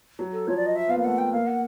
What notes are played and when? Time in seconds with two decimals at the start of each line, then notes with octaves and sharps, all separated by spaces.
0.19 F#3
0.33 A4
0.47 F3 C#5
0.57 D5
0.66 D#5
0.76 E5
0.88 B3 F5
0.95 A#3
0.99 F5
1.04 A3 F#5
1.18 G5
1.33 A#3 F5
1.47 F#5